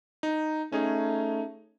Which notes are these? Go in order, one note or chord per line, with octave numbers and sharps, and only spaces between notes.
D#4
A3 C#4 D#4 G#4